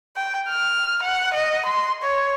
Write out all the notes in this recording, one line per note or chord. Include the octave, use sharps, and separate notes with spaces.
G5
F6
F#5
D#5
C6
C#5